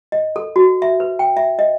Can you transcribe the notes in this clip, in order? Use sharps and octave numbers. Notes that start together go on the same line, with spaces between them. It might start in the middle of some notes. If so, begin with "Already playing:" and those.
D#5
A4
F#4
E5
B4
G5
E5
D#5